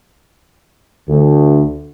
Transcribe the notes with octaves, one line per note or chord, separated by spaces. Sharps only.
D2